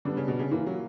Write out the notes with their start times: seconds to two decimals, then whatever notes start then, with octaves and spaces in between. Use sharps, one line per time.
0.05 D3 G3 B3 D4
0.17 C#3
0.28 B2
0.39 C#3
0.51 A#2 E3 A#3 E4
0.66 F#3